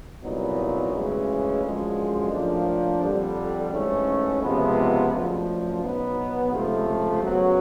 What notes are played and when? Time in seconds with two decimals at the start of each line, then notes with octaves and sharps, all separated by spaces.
0.22 C2 A#2 F#3 B3 D#4
0.93 D2 C#3 E3 G#3 C#4
1.63 F#2 D3 F3 G#3
2.32 A2 F3 A#3 D4
3.02 F2 D3 G3
3.72 G#2 E3 A3 C#4
4.41 C#2 C3 F3 G#3 B3
5.11 F#2 D3 F3 A3
5.81 B2 F#3 B3 D#4
6.51 C#2 C3 F3 A3
7.21 F#2 C#3 F#3 B3